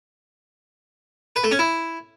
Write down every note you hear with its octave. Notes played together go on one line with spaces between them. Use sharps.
B4
A3
C#4
E4